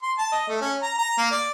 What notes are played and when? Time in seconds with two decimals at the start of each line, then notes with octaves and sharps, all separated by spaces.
0.02 C6
0.18 A5
0.32 D#5
0.48 A3
0.61 C#4
0.82 A#5
0.98 A#5
1.18 A#3
1.31 D5